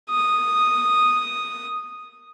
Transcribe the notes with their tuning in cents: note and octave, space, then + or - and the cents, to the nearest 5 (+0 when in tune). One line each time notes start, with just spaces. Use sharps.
D#6 -5